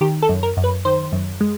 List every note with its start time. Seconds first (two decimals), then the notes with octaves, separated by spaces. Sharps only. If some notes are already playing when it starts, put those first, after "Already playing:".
0.01 D#3 G4
0.22 A4
0.29 F#2
0.43 A#4
0.57 F#2
0.64 B4
0.85 D#3 C5
1.12 F#2
1.41 G#3